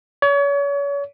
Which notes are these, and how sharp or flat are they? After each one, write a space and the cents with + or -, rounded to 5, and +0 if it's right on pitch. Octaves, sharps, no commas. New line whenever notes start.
C#5 +35